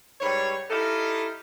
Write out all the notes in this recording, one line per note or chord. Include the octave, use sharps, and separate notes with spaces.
G#2 G3 B4 C#5
D#4 E4 G4 A4 D#5 F5